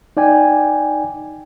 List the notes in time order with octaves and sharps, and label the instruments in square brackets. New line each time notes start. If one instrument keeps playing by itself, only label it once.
[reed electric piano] D#4 D5 G5 G#5